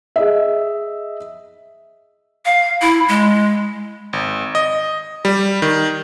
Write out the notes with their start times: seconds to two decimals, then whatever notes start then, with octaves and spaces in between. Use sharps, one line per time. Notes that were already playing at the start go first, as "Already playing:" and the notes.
0.16 G#4 D#5 E5
2.46 F5
2.82 E4
3.09 G#3
4.13 G#1
4.55 D#5
5.25 G3
5.62 D#3